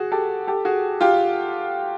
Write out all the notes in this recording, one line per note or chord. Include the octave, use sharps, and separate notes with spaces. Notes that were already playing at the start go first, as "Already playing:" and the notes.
Already playing: F#4 G#4
G4 A4
G4 A4
F#4 G#4
F4 G4